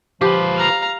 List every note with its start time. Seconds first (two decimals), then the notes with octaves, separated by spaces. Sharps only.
0.21 F3 F4 G4 B4
0.56 F5 A#5